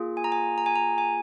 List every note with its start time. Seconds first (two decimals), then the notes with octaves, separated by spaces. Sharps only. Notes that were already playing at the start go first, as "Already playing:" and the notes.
Already playing: A#3 F4 G#4
0.17 G#5
0.24 A#5
0.32 G#5
0.58 A#5
0.66 G#5
0.76 A#5
0.98 G#5